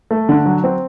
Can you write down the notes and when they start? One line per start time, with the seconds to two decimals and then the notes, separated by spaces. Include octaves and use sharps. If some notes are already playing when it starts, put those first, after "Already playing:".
0.11 A3
0.29 D3
0.46 F#3
0.64 C4